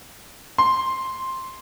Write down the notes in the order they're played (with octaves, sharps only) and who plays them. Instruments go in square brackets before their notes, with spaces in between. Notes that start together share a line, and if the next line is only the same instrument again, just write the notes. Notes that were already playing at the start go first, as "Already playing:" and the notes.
[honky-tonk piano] C6